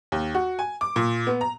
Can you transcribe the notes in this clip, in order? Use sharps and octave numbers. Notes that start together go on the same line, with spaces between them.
D#2
F#4
G#5
D6
A#2
B3
A#5